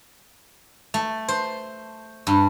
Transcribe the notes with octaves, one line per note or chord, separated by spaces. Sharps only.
A3
C5
G2